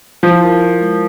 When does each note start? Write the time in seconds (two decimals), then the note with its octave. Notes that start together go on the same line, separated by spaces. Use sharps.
0.23 F3 E4
0.43 A#4
0.62 E4
0.80 G#3